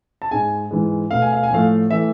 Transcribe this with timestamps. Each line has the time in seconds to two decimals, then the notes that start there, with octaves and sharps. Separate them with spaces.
0.22 A5
0.31 G#2 G#3 G#5
0.71 G#2 E3 G#3
1.11 B2 A3 F5
1.22 G#5
1.32 F5
1.43 G#5
1.50 A2 F3 A3 F5
1.91 E3 A3 E5